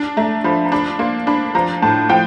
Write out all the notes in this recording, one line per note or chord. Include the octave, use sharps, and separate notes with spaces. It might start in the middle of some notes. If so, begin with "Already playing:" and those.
Already playing: D4
A3 A#5
F3 B5
A#5
D4 B5
A#3 C6
D4 B5
F3 A#5
A2 A5
F3 G5